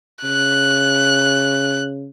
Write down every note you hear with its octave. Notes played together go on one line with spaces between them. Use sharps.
C#3 F#6